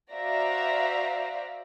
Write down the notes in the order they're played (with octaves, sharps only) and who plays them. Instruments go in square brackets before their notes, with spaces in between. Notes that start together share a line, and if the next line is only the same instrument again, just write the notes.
[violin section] F#4 C5 D5 E5 F5 A#5